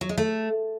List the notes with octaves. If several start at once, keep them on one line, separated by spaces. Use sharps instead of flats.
F#3
G#3
A3